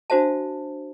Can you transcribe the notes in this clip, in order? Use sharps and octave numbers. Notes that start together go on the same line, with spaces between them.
D4 F#4 C5 E5 A5